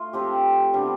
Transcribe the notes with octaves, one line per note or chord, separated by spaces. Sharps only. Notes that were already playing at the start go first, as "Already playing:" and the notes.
Already playing: A3 F4 A4
F3 C4 G4
C3 G3 B3 D4